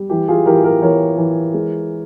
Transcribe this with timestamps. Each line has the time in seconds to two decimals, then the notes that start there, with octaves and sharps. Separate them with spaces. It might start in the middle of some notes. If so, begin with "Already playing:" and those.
Already playing: G3
0.09 E3 G4
0.28 F4 G#4
0.46 E3 G4 A#4
0.64 G4 A#4
0.82 E3 A#4 C#5
1.17 E3
1.54 G#3